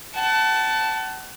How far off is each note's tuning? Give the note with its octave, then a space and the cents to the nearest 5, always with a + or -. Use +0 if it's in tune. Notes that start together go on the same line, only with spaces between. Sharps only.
F#5 +35 A5 +0